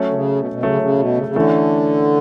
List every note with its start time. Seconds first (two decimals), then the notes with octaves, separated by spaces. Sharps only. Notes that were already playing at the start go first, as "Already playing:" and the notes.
Already playing: F#3 A3 C#4
0.09 D3
0.14 C#3
0.39 B2
0.51 B2
0.62 C#3 F#3 A3 C#4
0.82 C#3
0.99 B2
1.17 C#3
1.28 C#3
1.36 D3 E3 A3 C#4